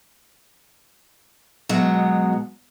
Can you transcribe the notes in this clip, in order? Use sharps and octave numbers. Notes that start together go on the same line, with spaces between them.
B2 F#3 G#3